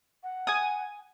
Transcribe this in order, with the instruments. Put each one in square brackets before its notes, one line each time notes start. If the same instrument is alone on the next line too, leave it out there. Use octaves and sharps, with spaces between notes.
[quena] F#5
[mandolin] G#5 D#6